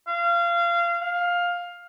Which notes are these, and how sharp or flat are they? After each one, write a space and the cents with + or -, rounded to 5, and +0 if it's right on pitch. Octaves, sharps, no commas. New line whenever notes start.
F5 -25
F5 +10